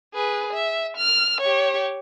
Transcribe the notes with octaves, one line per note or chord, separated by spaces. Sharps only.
G#4 B4
E5
F6
G4 C#5